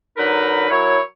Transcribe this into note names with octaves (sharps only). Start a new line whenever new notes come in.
D3 F#3 D#4 A#4 B4
F#3 E4 A#4 C#5